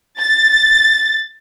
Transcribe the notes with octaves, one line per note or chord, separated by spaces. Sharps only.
A6